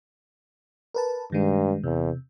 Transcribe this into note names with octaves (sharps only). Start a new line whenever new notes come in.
A#4 B4 A5
G2 D#3 G#3
E2 C3